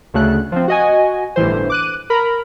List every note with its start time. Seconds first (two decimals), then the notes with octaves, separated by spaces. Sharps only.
0.14 D2 C#3 A3 F#6
0.52 F3 C4
0.68 F#4 D#5 G#5
1.36 G1 A2 E3 C5
1.70 D6 F#6 D#7
2.10 A#4 B5